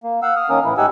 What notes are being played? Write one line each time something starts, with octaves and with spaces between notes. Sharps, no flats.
A#3
F5 F#5 E6
D#6 F6
D#3 A#3 C#4 A#4 D#6
A2 E3 E4
G#2 D#4 G4 F#5 G#5 E6